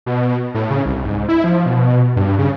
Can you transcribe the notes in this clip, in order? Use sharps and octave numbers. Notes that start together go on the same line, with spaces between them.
B2
A2
C#3
C2
G#2
E4
F3
B2
G2
C#3